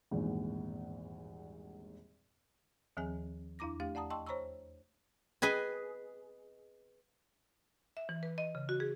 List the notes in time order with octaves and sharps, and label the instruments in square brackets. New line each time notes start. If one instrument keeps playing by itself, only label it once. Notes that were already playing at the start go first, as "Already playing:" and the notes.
[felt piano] G#1 E2 G2 A#2
[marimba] D#2 D#3 F3 C4 G#4 G#5
E2 D4 E4 A#5 D6 A#6
A3 D4 G4 F5
D5 F#5 A5 A#5 D#6
D#5 G5 A5 C6 C#6 E6
C5 C#5 A#5 B5 C#6 E6
[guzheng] G#4 B4 D#5 G#5
[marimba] E5
E3
B4
D#5
C#3
F#4
G#4